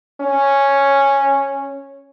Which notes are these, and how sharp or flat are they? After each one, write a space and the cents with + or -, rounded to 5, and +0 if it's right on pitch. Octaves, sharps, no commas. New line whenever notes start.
C#4 -5